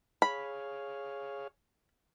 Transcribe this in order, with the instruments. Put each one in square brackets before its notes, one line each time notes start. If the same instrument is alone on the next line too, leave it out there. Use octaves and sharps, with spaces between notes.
[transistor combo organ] G#4 C#5 F5 [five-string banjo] B5